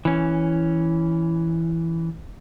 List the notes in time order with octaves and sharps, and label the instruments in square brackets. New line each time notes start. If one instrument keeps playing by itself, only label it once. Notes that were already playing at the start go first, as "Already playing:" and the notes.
[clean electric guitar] E3 C#4